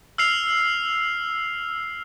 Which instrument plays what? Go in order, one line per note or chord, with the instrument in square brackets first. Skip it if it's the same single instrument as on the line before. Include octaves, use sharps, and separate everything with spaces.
[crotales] E6 F6 C7 F7